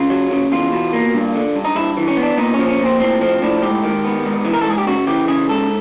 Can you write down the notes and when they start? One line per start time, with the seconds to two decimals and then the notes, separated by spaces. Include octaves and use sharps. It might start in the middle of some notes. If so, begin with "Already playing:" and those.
Already playing: C#3 F4
0.10 F#3
0.31 C#3
0.52 E2 F4
0.72 B2
0.93 A#3
1.14 G2
1.35 D3
1.56 G2
1.65 D#4
1.75 G2 E4
1.97 E3
2.08 C#4
2.17 B3
2.23 D4
2.38 A#2 D#4
2.54 C#4
2.59 F3
2.69 C#4
2.80 A#2
2.85 C4
3.00 A2 C4
3.21 F3 C4
3.42 A2 D4
3.62 G#2 G4
3.84 D#3
4.04 B3
4.25 G#2
4.45 E3
4.53 A#4
4.61 A4
4.66 G#2 G#4
4.78 G4
4.87 C#3 F#4
5.07 E3 G4
5.28 C#3 G#4
5.49 G#2 A4